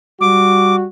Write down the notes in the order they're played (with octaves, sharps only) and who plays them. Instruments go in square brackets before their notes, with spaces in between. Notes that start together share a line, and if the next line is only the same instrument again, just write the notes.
[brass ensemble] G3 F#4 [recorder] D6